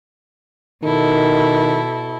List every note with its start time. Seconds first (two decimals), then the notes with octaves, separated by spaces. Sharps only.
0.83 B2 D#3 E4 A4